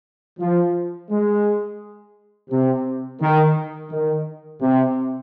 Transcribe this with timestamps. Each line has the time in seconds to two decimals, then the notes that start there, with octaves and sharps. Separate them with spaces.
0.39 F3
1.10 G#3
2.50 C3
3.21 D#3
3.91 D#3
4.61 C3